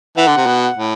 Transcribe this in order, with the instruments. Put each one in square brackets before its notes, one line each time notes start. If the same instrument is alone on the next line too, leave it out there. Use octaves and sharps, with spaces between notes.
[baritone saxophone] E3 [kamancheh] F#5
[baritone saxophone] D3
C3
B2
A2